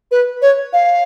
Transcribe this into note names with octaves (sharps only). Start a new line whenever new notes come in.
B4
C#5
F5